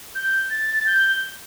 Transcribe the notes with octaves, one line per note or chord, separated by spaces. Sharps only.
G6
A6
A6
G6